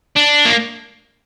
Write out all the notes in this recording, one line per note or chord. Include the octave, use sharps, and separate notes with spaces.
D4
A#3